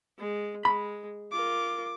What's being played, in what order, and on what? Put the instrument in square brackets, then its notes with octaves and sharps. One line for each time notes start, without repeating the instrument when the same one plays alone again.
[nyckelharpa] G#3
[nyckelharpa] G#3 [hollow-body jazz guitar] B5
[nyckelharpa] F4 A#4 [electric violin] D6